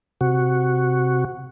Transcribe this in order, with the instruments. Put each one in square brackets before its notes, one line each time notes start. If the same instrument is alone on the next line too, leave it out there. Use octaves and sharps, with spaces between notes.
[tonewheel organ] C3 F#4